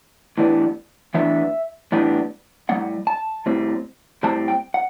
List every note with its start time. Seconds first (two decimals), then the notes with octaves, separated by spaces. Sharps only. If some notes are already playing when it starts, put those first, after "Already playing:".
0.38 A2 E3 G3 B3 D4
1.14 A2 E3 G3 B3 D4 E5
1.92 A2 E3 G3 B3 D4
2.69 A2 G3 C4 F#5
3.07 A5
3.46 A2 G3 C4
4.23 A2 G3 C4 A5
4.48 G5
4.74 F#5